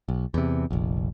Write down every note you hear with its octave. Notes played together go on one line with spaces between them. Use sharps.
B1
E2 C3
F1 A#1